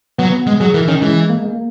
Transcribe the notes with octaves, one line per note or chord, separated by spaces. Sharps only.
F#3 B3
B3
G#3
F#3 G#4
E3 A#4
D#3 C#4
E3 G#3
A#3
G#3
A#3